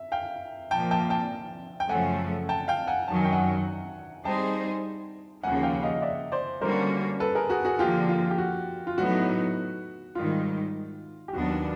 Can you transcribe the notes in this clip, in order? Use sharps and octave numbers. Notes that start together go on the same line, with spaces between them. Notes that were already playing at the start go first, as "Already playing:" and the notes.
Already playing: E5
F5 G5
A#2 F3 A#3 G5 A5
G5 A5
G5 A5
G5
F#2 C#3 F3 A3 C#4 F#5 G#5
G5 A5
F5 G5
F#5 G#5
F#2 D#3 F#3 A5
G#5
G5
F#5 G#5
G3 C4 D#4 G#4 C5 G5 A5
D#2 C#3 F3 A#3 F#5 G#5
F5 G5
D#5 F5
D5 E5
C5 D5
D3 G3 A#3 C#4 F#4 A#4 C5
A4 B4
G#4 A#4
F#4 G#4
F#4 G#4
D3 F3 A#3 F4 G4
F4
G4
F#4
F4
A2 F#3 B3 D#4 F#4
G#2 D#3 G3 F4
G4
D#2 D#3 F#3 B3 D4 F#4